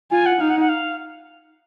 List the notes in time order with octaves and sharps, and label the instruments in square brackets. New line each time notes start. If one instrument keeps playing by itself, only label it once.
[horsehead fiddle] F4 [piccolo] G#5
[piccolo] F#5
[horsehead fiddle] D#4 [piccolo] F5
[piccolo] F#5
F#5
F5